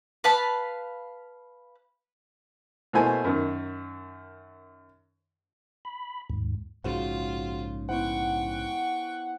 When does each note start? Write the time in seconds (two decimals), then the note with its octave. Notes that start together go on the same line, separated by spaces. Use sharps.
0.24 B4 F5 A5 B5
2.93 B2 A3 A#3 E4 C5 G#5
3.24 F#2 D#3
5.85 B5
6.30 D#2 G#2
6.84 A#1 G#2 C#3 F4 F#4 C5 F#5
7.89 B3 E4 C5 F#5 G5 C#6